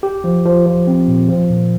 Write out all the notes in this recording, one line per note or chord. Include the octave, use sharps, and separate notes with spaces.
G4
F3
F3
F3
C4
A#2
F3
A#2